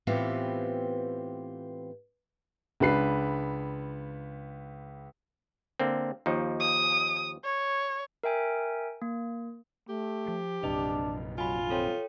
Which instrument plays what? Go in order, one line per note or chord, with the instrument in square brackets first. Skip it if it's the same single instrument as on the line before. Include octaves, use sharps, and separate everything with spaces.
[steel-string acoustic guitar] A2 E3 B3 C4 F4 G4
[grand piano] C#2 D4 B4 C7
[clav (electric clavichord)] D3 A#3 C4
D#2 F3 D#4
[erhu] D#6
C#5
[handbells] A#4 E5 G5 G#5
A#3
[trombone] A3 [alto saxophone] G4
[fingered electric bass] F3
[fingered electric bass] A#1 F#2 C3 [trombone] D4 [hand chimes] B4 D#5
[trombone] F#3 [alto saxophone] F4 [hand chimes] G#5 B5
[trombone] C4 [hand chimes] A4 C#5 G5